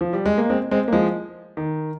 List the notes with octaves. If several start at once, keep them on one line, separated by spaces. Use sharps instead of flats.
F3
G3
G#3
A#3
G#3 C4
G#3 C4
A#3
F3 G#3
D#3